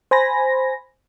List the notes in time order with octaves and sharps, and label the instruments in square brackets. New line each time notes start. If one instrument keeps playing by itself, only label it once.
[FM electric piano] C5 G#5 B5 A#6